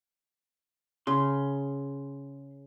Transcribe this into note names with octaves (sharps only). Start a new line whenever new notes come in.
C#3 C6